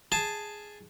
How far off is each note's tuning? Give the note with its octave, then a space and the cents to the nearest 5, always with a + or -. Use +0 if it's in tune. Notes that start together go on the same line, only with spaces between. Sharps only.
G#4 +0 A5 +0